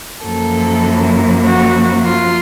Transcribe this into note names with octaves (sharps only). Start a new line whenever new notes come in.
F#2 F3 A#3 A4
F#4
F4